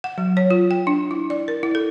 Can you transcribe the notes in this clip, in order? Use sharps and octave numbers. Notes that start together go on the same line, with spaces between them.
F#5
F#3
C#5
F4
G5
D4
E4
D5
A#4
E4
A4